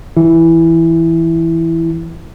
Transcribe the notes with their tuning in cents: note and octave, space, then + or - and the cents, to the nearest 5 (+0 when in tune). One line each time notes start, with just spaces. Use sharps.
E3 +0 E4 +0